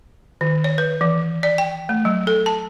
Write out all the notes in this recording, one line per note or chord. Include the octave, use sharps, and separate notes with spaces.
D#3
C#5
B4
E3
D5
G5
A3
F#3
A4
A5